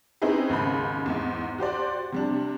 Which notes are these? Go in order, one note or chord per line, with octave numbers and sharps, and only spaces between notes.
C4 C#4 D#4 E4 G#4 B4
D#2 G#2 C#3 B5
E2 G#2
F#4 G4 C5 D5
C3 G3 D4